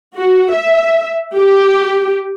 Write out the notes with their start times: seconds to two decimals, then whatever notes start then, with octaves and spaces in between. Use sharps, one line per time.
0.18 F#4
0.52 E5
1.38 G4